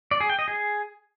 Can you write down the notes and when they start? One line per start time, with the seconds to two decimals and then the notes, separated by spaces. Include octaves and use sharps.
0.11 D5
0.20 G#4
0.30 G5
0.39 D#5
0.48 G#4